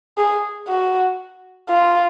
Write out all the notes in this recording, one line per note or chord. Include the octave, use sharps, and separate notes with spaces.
G#4
F#4
F4